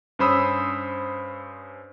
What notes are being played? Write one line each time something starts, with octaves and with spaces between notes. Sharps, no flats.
G2 C#4 C5 B5 D#6 E6